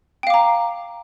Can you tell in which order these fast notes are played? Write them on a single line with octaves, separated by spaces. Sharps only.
G5 F5 D6 A#5